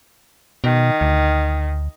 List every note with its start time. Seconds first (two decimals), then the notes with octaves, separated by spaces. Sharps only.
0.64 B2 D#3
1.01 D2